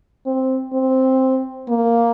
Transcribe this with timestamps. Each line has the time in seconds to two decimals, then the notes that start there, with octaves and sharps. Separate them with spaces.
0.26 C4
0.73 C4
1.69 A#3